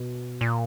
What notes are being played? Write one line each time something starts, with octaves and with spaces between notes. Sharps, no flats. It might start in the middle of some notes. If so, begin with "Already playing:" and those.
Already playing: B2
A#2